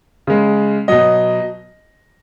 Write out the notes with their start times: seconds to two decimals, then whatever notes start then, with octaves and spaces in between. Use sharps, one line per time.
0.27 C#3 G#3
0.88 B2 F#3 D#5